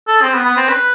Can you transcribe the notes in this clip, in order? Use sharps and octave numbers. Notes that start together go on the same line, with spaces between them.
A4
C4
B3
B3
C4
B4